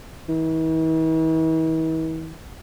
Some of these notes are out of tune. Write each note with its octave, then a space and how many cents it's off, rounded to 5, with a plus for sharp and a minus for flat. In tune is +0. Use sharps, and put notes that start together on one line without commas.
E3 -45